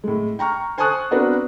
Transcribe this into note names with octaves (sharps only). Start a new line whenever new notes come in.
A2 G#3
G5 A#5 C#6 F6
C5 G#5 A5 C#6 D#6 F#6
B3 C4 D4 F#4 A#4 B4